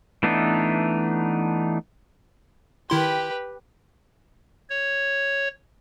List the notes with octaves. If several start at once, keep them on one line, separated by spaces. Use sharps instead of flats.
E3 A3 B3 D4 D#4
D#3 E4 G4 B4 C6
C#5